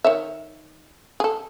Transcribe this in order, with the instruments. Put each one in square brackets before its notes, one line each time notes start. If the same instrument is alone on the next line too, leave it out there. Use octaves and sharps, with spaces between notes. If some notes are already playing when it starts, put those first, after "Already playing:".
[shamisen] D#3 C#5 E5
G#4 A4